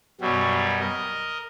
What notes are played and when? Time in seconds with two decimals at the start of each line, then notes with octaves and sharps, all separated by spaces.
0.21 F#2 B2 F#3 G3
0.80 A#4 D#5